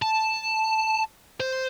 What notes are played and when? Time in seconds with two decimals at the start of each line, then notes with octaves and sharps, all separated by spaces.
0.02 A5
1.40 C5